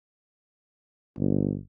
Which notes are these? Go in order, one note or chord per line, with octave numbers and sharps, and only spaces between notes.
G1